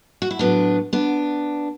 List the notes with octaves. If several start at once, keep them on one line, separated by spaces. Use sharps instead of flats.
F#4
E4
A2 F#3 B3 D4
B3 D4